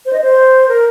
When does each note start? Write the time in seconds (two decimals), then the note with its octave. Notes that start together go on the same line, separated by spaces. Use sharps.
0.06 C5
0.13 D#5
0.21 C5
0.68 A#4